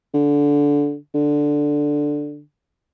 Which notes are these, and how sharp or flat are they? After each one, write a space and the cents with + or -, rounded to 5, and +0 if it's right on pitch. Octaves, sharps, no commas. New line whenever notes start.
D3 -20
D3 +0